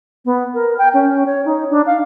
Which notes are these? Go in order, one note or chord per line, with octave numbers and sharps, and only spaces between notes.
B3
A#4
G5
C#4
C#5
D#4
D4
F5